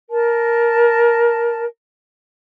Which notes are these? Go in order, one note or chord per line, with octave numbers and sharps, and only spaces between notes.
A#4 A5